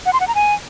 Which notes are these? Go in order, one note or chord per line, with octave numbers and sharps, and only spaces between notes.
F#5
C6
F#5
A#5
G#5